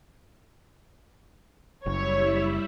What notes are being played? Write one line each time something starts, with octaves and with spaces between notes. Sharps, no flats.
F#1 G3 E4 C#5 E5